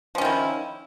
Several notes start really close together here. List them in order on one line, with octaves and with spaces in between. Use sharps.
F3 C#4 D#3 E4